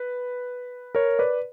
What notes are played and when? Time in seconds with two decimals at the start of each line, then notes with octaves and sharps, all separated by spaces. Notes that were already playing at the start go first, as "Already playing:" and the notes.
Already playing: B4
0.95 A#4 C#5
1.19 B4 D5